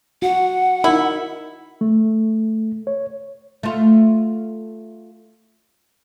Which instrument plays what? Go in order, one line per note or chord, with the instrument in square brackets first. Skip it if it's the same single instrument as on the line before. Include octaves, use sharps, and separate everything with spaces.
[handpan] F#4 [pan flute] F#5
[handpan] D#4 A#4 [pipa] E4
[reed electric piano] A3
C#5
[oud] A3 F4